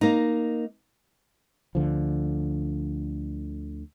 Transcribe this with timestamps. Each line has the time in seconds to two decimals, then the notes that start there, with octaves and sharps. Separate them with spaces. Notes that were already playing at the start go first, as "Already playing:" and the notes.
0.01 A#3 D#4
1.75 D2 D3 F3